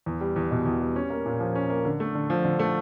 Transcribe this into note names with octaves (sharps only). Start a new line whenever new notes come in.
E2
G3
E2
B2
E2
G3
C#4
A#3
A#2
F3
C#4
A#3
D3
A3
D3
F3
D3
A3